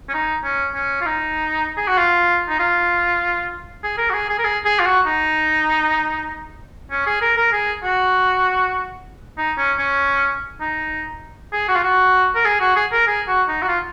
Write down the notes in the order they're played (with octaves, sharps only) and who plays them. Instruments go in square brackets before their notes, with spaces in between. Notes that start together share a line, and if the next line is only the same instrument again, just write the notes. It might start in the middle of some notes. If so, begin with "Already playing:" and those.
[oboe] C#4
D#4
C#4
C#4
F4
D#4
G#4
F#4
F4
D#4
F4
G#4
A#4
F#4
G#4
G#4
A#4
G#4
G#4
F4
F#4
D#4
C#4
G#4
A#4
A#4
G#4
F#4
D#4
C#4
C#4
D#4
G#4
F#4
F4
F#4
A#4
G#4
F#4
G#4
A#4
G#4
F#4
D#4
F#4
F4